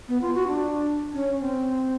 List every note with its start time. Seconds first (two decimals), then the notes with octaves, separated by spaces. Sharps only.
0.08 B3
0.22 F4
0.35 F#4
0.48 D4
1.14 C#4
1.40 C4